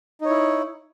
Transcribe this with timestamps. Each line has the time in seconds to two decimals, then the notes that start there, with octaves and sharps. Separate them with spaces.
0.21 D#4
0.25 C#5
0.29 E4